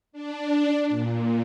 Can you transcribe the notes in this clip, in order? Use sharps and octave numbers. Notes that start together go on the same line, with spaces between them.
D4
A#2